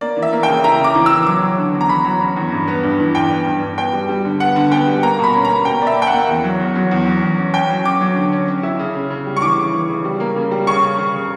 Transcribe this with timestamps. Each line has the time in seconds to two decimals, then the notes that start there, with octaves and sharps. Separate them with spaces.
0.01 A#3 D5
0.17 E3
0.22 E5
0.33 A#3
0.43 G5
0.48 C#3
0.64 E4 A#5
0.80 C#3 D6
0.95 E3
1.06 E3 E6
1.27 F#3 D6
1.42 F#3
1.58 D3
1.73 E2
1.81 A#5
1.89 E2 B5
2.05 F#3
2.21 C#4
2.36 E2
2.52 G2
2.68 B3
2.83 G2
3.00 E3
3.15 G2 G5
3.30 B3
3.46 G2
3.62 G2
3.78 B3 G5
3.93 G3
4.09 G3
4.25 D3
4.40 B3 F#5
4.56 D3
4.72 B3 G5
4.87 G3
5.03 A#3 A#5
5.19 B2 B5
5.34 C#4
5.45 A#5
5.50 A#3
5.65 B2 G5
5.82 A#3 D5
5.87 E5
5.97 A#3 G5
6.07 F#5
6.12 A#3
6.28 E2
6.44 F#3
6.60 E2
6.75 F#3
6.91 E2
7.06 F#3
7.22 E2
7.38 C#4
7.54 C#4 G5
7.70 F#3
7.85 C#4 D6
8.01 F#3
8.16 D3
8.32 C#4
8.48 C#4
8.63 E4
8.79 C#3
8.95 C#3
9.10 C#3
9.26 G3
9.36 C#6
9.42 E3 D6
9.58 C#3
9.73 E3
9.89 C#3
10.05 G3
10.20 A#3
10.36 C#3
10.51 G3
10.67 C#3 C#6
10.83 C#3
10.99 C#3
11.14 C#3